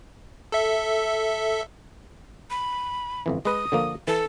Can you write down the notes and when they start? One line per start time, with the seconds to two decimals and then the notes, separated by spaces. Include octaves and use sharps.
0.52 A4 E5
2.50 B5
3.26 G1 F2 E3
3.45 G#3 B4 D#6
3.72 D3 F3 A#3
4.08 E3 A4